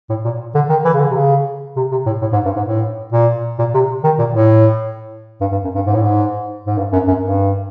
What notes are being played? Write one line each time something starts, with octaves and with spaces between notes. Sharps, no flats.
A2
A#2
D3
D#3
E3
C#3
D3
C3
C#3
C3
C3
A2
A2
G#2
G2
G#2
A2
A#2
A#2
C3
D#3
A#2
A2
G2
G2
F#2
G2
G#2
A2
G#2
G#2
G2
F#2
F#2
G2